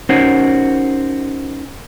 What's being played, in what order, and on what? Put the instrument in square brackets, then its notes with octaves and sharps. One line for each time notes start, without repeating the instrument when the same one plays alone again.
[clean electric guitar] C#4 D#4 F#4 A#4 C5